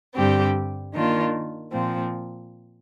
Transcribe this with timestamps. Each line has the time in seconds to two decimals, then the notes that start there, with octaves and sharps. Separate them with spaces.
0.14 G2 D3 G3 C4 G4
0.93 D#3 A#3 D4 F4
1.71 A#2 F3 C4